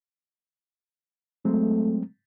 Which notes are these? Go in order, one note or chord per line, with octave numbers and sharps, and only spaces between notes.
F#3 G#3 A3 C4